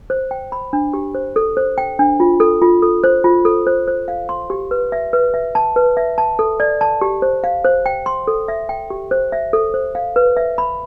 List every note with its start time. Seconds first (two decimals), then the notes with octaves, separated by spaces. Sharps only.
0.10 C5
0.31 G5
0.52 B5
0.73 D4
0.94 G4
1.15 C5
1.36 A4
1.57 C5
1.78 G5
1.99 D4
2.20 F4
2.40 A4
2.62 F4
2.82 A4
3.04 C5
3.24 F4
3.45 A4
3.67 C5
3.88 C5
4.08 F5
4.29 C6
4.50 G4
4.71 B4
4.92 E5
5.13 B4
5.34 E5
5.55 A5
5.76 B4
5.97 E5
6.18 A5
6.39 A4
6.60 D5
6.81 A5
7.01 G4
7.22 C5
7.44 F5
7.64 C5
7.86 G5
8.06 C6
8.27 A4
8.48 E5
8.69 G5
8.90 G4
9.11 C5
9.32 E5
9.53 A4
9.74 C5
9.95 F5
10.16 B4
10.37 E5
10.58 B5